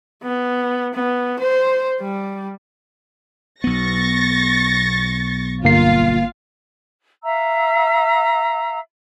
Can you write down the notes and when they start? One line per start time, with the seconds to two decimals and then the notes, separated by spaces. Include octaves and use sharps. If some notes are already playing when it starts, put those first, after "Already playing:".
0.22 B3
0.94 B3
1.40 C5
2.01 G3
3.64 B1 B3 C#6 A6 A#6
5.64 G1 A#3 F4 F5 C7
7.23 E5 F5 A#5 E6